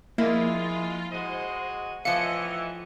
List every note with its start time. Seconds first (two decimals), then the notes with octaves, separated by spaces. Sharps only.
0.18 F3 G#3 A#3 E4 F4
1.12 G#3 F#4 C5 D#5
2.05 A2 E3 F3 D#5 F5 C#7